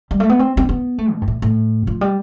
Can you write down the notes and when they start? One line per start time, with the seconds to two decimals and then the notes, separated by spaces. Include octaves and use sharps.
0.11 G3
0.20 A3
0.30 B3
0.39 C4
0.57 C4
0.69 B3
0.98 A3
1.13 B2
1.21 G2
1.28 A2
1.42 A2
1.87 F3
2.01 G3